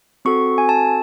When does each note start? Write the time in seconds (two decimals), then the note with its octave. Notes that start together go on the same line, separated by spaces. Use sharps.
0.25 C4 F#4 A4 C#6
0.58 G#5
0.69 A5